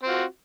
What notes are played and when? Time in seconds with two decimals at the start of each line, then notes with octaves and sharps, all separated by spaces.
0.03 C4
0.06 F4
0.09 F#4